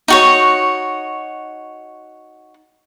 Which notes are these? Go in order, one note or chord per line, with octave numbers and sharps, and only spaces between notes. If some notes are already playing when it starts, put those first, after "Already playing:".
D#4 F#4 C#5